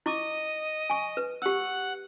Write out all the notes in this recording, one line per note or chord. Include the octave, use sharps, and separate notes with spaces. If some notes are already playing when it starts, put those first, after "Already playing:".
E4 D#5 C#6 D6
G#5 C#6
B4
G4 F#5 E6